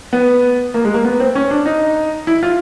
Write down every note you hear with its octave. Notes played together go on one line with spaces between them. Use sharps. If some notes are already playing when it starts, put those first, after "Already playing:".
B3
A#3
G#3
A#3
B3
C4
C#4
D4
D#4
E4
F4